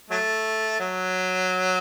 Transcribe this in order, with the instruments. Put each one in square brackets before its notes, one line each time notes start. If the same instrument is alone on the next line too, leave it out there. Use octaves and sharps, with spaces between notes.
[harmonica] F#3 A3
F#3